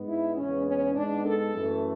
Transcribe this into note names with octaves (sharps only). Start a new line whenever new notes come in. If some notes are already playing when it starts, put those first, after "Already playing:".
Already playing: G#2 G#3 B3
E4
E2 C#3 G#3 B3 C#4
C#4
G#2 G#3 B3 D4
A4
F#2 E3 A3